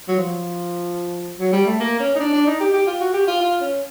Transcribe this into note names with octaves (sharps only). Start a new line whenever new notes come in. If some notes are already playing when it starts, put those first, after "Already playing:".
F#3
F3
F#3
G3
A3
A#3
C#4
D#4
D4
D4
D#4
G4
G4
F4
F#4
G4
F4
F4
C#4